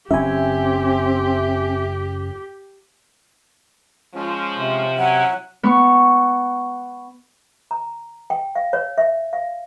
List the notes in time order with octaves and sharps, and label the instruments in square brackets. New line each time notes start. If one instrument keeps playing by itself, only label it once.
[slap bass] F#1 C#4 [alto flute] C4 [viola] G4 [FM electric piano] E5 G#5
[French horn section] F3 [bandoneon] G#3 C#4
[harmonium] C3
[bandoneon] F#3 [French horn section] C#4 E4 [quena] F#5
[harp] B3 C#6
[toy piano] A#5
G5
F5
C#5
E5
F5